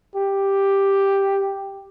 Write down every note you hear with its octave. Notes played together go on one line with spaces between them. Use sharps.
G4